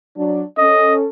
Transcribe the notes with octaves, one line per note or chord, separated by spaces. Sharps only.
F#3 D4
C#4 A4 D#5